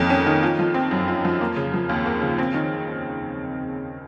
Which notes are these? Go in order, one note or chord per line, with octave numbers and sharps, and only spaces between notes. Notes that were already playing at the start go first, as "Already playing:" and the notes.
Already playing: F2 D#3 A#3 C#4
C#4
D#3
F4
F3
C4
F#2
F4
F3
A#3
C#3
F3
D#2
A#3
C#3
C4
D#3